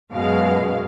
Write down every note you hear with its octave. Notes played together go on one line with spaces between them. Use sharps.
F#2 B2 G#3 F5